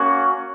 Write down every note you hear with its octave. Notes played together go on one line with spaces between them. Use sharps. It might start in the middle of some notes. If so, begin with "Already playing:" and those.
Already playing: A#3 C#4 F#4